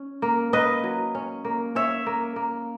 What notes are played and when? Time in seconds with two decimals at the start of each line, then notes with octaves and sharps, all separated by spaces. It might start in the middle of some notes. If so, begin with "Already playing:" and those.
Already playing: C#4
0.22 A#3
0.53 A#3 B4 D#5
0.84 F#3
1.15 C#4
1.45 A#3
1.75 C#4 C#5 E5
2.06 A#3
2.36 A#3